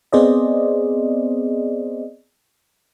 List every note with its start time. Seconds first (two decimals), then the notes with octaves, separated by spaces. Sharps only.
0.13 B3 C4 G#4 C5 D5 D#5